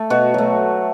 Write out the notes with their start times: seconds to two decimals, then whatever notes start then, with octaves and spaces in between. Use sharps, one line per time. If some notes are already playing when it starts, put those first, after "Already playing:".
Already playing: A3 A4
0.10 B2 F#4
0.34 F#3 A3